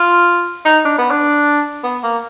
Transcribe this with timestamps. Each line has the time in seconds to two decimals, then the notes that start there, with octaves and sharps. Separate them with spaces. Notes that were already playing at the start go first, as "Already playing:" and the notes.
Already playing: F4
0.65 D#4
0.85 D4
0.98 B3
1.11 D4
1.84 B3
2.03 A#3